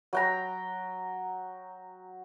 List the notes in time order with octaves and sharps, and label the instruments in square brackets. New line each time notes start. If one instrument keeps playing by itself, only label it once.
[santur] F#3 G5 A#5